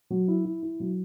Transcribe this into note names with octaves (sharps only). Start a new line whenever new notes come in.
F#3
E4
E4
E4
F#3